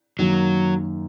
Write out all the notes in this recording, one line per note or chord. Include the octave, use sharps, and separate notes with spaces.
F#2 D#3 F#3 A#3